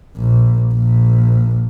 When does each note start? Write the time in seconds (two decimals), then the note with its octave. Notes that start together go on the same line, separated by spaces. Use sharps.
0.16 A#1
0.74 A#1